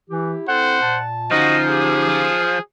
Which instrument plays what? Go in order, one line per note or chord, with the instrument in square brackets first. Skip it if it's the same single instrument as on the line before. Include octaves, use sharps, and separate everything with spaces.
[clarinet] E3 [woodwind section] E4 G4
[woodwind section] C4 E4 A4 [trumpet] C5 [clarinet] F#5
[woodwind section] A#2 A5
[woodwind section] D3 C#4 D#4 [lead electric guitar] F3 [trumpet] F#4 [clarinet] D#5
[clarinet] G4 [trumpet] G#4
[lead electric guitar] F3